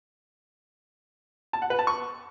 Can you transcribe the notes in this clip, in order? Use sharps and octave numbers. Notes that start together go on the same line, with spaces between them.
A5
F#5
B4
A5
C#6